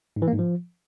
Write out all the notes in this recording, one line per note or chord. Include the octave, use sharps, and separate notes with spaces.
G#2
E3
A#3
G#2
F3